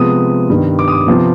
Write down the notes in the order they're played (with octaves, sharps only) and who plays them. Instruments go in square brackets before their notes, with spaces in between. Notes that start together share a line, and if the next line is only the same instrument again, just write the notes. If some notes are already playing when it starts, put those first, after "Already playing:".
Already playing: [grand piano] C3 F3 G#3 B3 D#6
G2 D#3 G3 B3
D6
D#6
D6
C3 F3 B3